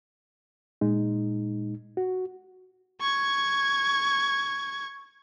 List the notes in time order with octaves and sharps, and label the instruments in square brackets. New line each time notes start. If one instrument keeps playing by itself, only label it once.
[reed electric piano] A#2 G#3 D#4
F#4
[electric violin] C#6 G#6